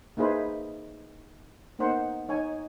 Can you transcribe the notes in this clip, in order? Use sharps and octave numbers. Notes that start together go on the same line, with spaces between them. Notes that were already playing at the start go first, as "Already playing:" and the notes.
A#3 D#4 E4 G#4 B4 C5
A#3 B3 D#4 A#4 C5 F#5
D#4 C#5 G#5